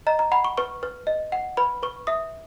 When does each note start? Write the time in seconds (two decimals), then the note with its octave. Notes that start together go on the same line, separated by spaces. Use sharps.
0.07 D#5 A#5
0.19 A#5
0.32 F#5 B5
0.45 C#6
0.57 B4 C#6
0.83 B4
1.07 D#5
1.32 F#5
1.57 B4 B5
1.83 B4 C#6
2.07 E5 D#6